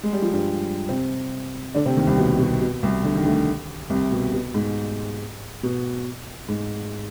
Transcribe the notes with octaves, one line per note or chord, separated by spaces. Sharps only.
G#3
G3
F3
G2 G3
C3 C4
D3 D4
C3 C4
D#2 D#3
C2 C3
B2
B2
B2
C2 C3
D3
D#3
D2 D3
C2 C3
B2
B2
G#2
B2
G#2